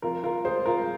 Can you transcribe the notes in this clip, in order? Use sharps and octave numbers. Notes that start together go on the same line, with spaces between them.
F2 F4 A#4
F4 A#4
G#3 G#4 C5
F4 A#4